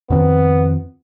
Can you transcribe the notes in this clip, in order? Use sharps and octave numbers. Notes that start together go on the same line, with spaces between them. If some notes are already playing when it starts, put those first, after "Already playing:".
F2 D#3 B3 C4